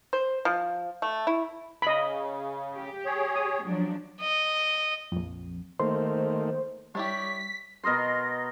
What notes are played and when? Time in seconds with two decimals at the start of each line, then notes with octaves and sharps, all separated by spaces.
0.13 C5
0.45 F3
1.02 A3
1.27 E4
1.82 C#3 D#5 B5
2.75 G4
3.05 G#4 C#5
3.36 D#6
3.64 F3 F#3 D4
4.21 D#5
5.12 A#1 F2
5.80 D#3 A3 A#3 C5
6.95 G3 D4 E4 G4 C#5 B6
7.83 B2 A#4 D#5 C6